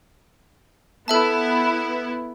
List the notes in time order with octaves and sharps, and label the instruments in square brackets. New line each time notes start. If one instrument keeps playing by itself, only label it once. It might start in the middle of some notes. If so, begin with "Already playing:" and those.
[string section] B3 E4 [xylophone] A4 E5 A5